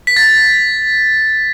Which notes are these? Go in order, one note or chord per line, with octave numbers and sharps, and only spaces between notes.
B6
A6